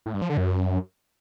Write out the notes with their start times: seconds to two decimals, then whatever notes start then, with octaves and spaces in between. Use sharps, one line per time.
0.06 A2
0.14 G2
0.22 F3
0.29 D3
0.37 F#2